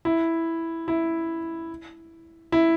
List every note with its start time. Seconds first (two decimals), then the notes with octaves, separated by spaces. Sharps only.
0.05 E4
0.88 E4
2.52 E4